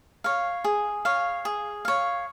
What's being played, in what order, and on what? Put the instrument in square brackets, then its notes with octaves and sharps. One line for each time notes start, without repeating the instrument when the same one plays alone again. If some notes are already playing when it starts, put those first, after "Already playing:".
[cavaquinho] C#5 F5
G#4
C#5 F5
G#4
C#5 F5